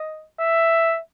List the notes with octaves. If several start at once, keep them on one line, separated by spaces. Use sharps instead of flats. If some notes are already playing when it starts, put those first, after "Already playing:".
Already playing: D#5
E5